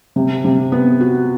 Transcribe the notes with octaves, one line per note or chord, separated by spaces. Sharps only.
C3
C3
B3
F#4